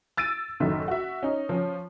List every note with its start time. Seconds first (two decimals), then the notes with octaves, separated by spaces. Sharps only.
0.17 E6 A6 D7 D#7
0.60 F#1 A2 D#3 F#3 D#4 E5
0.88 F#4 E5
1.23 C#4 D#4
1.49 F3 C#4